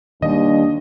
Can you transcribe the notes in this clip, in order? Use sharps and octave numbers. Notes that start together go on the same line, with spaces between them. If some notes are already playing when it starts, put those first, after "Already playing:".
D#2 D#3 G3 D4 D#5